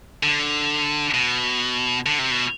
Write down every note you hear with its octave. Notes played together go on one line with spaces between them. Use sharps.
D3
B2
D3
C3
B2